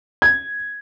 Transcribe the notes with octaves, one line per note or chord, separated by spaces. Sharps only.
G#6